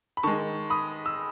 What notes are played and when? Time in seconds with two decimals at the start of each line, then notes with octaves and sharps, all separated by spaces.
0.17 B5
0.23 D#3 G#3 A5 C#6
0.70 B5 D#6
1.06 E6